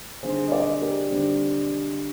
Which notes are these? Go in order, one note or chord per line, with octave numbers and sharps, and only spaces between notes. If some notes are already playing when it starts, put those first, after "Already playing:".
D3 G3 C4 D#4 G#4 C5
D#5
A#4 D5
G4 A#4
D3 G3 C4 D#4